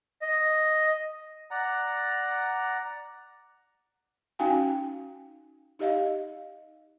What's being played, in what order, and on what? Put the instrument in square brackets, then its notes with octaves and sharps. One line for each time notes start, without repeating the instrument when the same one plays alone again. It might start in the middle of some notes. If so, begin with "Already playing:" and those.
[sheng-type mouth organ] D#5
[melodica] D5 F#5 A#5
[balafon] C#4 D#4 F#4 F5 G5 G#5
D#4 G4 D#5 F5